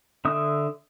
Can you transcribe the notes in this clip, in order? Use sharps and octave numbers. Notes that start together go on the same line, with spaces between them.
D3 E5 D#6